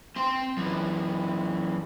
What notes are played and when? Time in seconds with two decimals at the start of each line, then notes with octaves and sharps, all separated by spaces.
0.16 C4 C6
0.57 F#2 E3